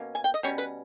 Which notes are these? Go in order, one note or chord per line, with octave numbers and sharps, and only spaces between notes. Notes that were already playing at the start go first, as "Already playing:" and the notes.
Already playing: B2 A#3 C#4
G#5
G5
D#5
B2 G3 C#4 C#5
B4